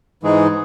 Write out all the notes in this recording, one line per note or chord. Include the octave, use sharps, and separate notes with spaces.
G#2 E3 G#3 D#4 G#4